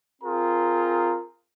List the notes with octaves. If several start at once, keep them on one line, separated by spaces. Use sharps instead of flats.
C4 F4 G#4 A#4 A#5